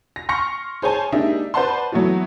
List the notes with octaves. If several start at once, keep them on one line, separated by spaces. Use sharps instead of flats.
A#6
C6 C#6 F6 A#6 C#7
G#4 C5 C#5 G#5 A5
G#3 A#3 D4 D#4 G4 E5
B4 C5 D5 F#5 A5 C6
E3 F#3 A3 B3 F#4